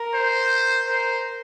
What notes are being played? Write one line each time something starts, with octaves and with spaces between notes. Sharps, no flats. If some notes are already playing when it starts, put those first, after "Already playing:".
Already playing: A#4
C5
A#4 C5